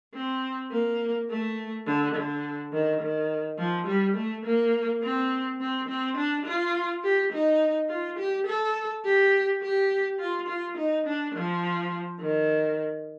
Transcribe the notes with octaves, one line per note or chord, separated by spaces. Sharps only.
C4
A#3
A3
D3
D3
D#3
D#3
F3
G3
A3
A#3
C4
C4
C4
D4
F4
G4
D#4
F4
G4
A4
G4
G4
F4
F4
D#4
D4
F3
D#3